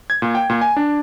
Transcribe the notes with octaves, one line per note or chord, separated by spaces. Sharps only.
G#6
A#2
G5
A#2
G#5
D4